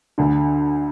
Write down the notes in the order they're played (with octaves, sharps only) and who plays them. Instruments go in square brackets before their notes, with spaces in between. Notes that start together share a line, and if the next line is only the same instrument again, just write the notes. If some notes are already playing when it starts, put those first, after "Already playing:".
[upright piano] D2 D3